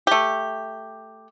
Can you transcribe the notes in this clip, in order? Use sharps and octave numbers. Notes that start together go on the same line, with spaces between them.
A3 G4